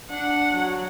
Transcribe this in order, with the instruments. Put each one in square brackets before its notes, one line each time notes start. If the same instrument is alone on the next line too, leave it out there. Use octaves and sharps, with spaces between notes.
[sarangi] D4 [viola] F#5
[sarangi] F#3